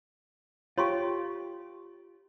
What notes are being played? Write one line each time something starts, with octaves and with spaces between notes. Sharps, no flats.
F4 G4 C#5 C6 C#6